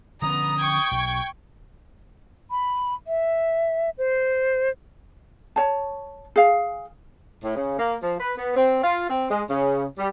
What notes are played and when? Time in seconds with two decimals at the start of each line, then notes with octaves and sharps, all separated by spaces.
0.22 D3 F3 B3 C#4 A#5 D#6
0.58 G5 C#6 G#6
0.91 B1
2.51 B5
3.07 E5
3.98 C5
5.56 C#5 A5
6.36 G#4 F5
7.44 A2
7.56 C#3
7.79 A#3
8.03 F3
8.20 B4
8.37 B3
8.56 C4
8.83 F4
9.10 C4
9.30 G#3
9.49 C#3
9.98 G3